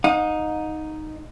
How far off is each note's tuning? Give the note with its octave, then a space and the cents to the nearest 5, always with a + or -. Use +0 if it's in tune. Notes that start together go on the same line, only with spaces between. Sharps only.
D#4 +0 F#5 -45